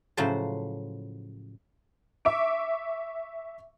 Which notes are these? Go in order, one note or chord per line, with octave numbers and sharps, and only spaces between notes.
A2 C#3 F3 F#3 C5 A5
E5 C#6 D6 D7